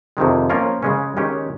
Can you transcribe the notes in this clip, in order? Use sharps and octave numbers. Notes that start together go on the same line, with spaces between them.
F2 C3 D#3 G#3
F3 A#3 C#4 F4 A#4
C#3 G#3 C#4
D#3 G#3 C#4 G4